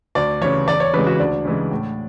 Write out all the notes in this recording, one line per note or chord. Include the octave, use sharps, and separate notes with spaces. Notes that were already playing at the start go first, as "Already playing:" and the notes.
D2 D5
C#3 E3 C#5
E2 D5
C#5
C#3 E3 G#3 B4
F#4
D2 D4
C#3 E3 G#3
A2